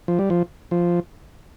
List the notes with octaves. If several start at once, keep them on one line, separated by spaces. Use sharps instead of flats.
F3
G3
F3
F3